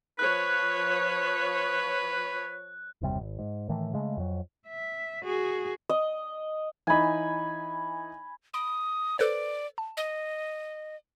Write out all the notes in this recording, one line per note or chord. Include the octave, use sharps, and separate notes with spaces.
F3 B4 C#5 F#6
F#1 D#2 C3 G3
G#1
G#2
A2 D#3 E3 A3
C#3 G#3 A3
F2 F#3
E5
F#4 G#4
D#5
E3 D#4 G#5 B5
B5 D#6 D7
A4 B4 C5 D5
A5
D#5